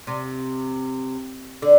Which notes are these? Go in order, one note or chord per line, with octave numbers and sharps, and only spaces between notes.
C3
D3